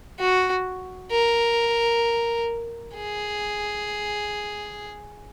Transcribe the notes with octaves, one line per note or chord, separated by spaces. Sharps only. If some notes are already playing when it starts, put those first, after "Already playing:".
F#4
A#4
G#4